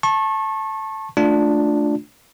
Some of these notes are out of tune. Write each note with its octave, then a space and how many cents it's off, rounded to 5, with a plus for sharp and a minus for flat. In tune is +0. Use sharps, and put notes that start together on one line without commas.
A5 +0 C#6 -30
A3 +0 D4 +0 F4 +10